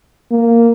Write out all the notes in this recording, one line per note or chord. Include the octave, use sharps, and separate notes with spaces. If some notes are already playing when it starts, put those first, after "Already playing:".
A#3